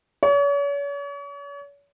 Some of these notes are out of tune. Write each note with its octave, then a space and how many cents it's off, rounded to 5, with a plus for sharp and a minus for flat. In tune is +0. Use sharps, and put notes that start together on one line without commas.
C#5 +40